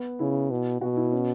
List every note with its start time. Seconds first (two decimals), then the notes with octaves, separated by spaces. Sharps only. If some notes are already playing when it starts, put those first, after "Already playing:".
Already playing: B3
0.20 C#3 E4
0.51 B2
0.81 B2 F#4
0.97 E4
1.13 C#4